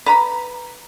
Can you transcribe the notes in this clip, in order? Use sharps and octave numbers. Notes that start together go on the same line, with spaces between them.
B4 A#5 B5